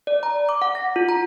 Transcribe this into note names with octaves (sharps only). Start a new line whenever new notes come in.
D5
A#5
D6
F#5
A#6
F4
A#5